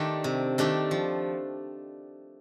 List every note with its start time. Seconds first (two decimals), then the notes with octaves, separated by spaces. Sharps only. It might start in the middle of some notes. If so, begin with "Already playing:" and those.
Already playing: D#3 A3 D4 G4
0.24 C3
0.58 D#3 A3 D4 G4
0.91 F3